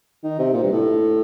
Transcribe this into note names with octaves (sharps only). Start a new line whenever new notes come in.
D#3
C3
A#2
G2
A2